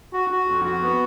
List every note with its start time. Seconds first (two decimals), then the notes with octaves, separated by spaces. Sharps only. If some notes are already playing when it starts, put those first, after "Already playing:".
0.13 F#4
0.30 F#4
0.47 F2
0.65 F#4
0.82 B3